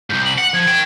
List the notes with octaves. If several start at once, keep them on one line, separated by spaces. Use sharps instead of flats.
C2 G#2 G6
F#7
F#5
F3 G#6
D#3 G5